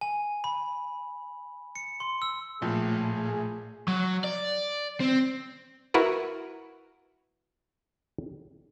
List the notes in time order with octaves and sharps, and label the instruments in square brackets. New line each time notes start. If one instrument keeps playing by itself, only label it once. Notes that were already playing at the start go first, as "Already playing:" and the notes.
[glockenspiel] G#5
B5
C#7
C6
E6
[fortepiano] A#1 [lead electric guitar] A2 [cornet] G#4
[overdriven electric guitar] F#3
D5
C4
[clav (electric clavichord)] E4 F#4 A#4 B4